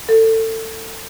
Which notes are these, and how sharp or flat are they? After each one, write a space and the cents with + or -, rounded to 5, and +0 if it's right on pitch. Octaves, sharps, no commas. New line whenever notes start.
A4 +25